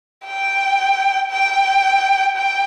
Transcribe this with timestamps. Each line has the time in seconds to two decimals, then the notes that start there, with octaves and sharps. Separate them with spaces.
0.25 G5
1.30 G5
2.36 G5